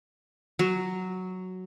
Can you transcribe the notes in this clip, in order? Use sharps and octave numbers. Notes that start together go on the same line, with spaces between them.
F#3